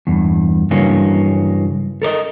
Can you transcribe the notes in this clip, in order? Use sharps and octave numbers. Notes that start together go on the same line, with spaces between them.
E2 G2
G2 C#3 E3 F#3 A#3 C#4
A4 A#4 D5 D#5